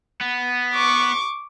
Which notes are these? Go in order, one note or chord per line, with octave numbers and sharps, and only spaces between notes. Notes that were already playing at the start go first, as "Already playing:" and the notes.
B3
C#6 D6